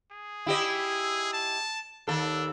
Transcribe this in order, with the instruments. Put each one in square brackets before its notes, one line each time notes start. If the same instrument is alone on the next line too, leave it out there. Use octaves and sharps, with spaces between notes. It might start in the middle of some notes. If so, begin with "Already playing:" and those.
[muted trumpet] G#4
[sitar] E4 G4 D#5
[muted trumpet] A5
[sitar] D#2 A4 [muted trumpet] D4